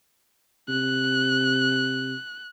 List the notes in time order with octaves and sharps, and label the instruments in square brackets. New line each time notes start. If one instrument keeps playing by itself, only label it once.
[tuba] C3 [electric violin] F#6